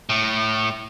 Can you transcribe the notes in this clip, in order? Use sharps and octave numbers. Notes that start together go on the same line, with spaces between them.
A2